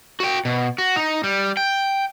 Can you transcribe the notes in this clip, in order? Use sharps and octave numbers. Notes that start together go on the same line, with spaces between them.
F#4 G5
B2
F#4
D#4
G3
G5